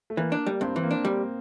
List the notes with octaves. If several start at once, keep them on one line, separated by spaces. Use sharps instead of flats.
A3
E3 A#3
D4
G3
G2 C4
E3
A#3
D4
G3